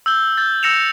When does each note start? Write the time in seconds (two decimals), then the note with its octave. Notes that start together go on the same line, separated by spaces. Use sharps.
0.06 E6 G6 G7
0.37 G6 A6
0.63 E6 A#6 C#7 E7 F7